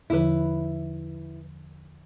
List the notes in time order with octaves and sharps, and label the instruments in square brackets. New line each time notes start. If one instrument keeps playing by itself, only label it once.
[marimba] E2 D3 F3 [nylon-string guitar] E4 B4